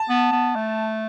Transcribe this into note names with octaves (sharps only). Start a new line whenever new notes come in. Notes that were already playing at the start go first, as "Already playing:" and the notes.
Already playing: A5
B3
B3
A3